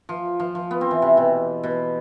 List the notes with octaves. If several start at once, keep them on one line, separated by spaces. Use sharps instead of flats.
F3
F3
F3
B3
C4
E3
C3
B2
B2